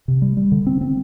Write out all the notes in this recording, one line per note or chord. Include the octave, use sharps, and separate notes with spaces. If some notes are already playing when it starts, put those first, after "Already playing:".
C3
G3
G3
D3
C4
C4